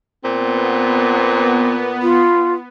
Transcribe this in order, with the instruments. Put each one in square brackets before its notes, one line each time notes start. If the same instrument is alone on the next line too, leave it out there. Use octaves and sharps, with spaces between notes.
[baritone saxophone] A#2 [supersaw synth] B3 [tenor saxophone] C4
[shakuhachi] F4